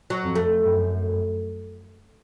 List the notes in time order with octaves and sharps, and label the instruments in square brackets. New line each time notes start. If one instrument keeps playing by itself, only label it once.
[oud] F#3
[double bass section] F2
[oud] A3
[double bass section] F#2